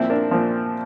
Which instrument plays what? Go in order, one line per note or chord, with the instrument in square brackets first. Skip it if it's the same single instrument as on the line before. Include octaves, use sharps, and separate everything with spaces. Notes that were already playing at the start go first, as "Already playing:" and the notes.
Already playing: [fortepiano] A#2 F3 C4 E4
A#3 D4
A#2 F3